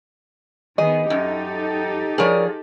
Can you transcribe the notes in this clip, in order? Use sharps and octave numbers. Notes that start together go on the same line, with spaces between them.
D#3 B3 G#4 D#5
F#2 D#4 G4 A4
F3 G#4 A#4 C#5 D5